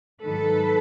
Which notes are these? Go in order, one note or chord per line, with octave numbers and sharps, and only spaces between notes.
G#2 D#3 F#3 A4 B4